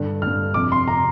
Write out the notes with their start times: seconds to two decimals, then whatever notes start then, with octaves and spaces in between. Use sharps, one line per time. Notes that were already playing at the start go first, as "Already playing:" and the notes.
Already playing: G2 D3
0.22 G2 D3 F6
0.54 F2 C3 D6
0.72 C6
0.88 C3 A#5